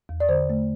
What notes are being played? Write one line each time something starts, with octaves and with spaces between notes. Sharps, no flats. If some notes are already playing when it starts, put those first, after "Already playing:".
E2
D5
D3 C5
A3